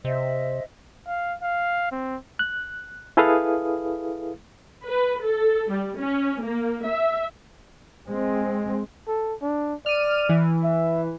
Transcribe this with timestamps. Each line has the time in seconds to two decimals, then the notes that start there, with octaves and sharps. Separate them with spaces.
0.05 C3 C5 D#5 E5
1.07 F5
1.42 F5
1.92 C4
2.39 F#6
3.17 E4 G#4 A4 B4 F5 D#6
4.87 B4
5.23 A4
5.70 G3
5.99 C#4
6.43 A#3
6.86 E5
8.07 G#3 C4
9.08 A4
9.41 D4
9.86 D5 F6 D#7
10.29 E3
10.64 E5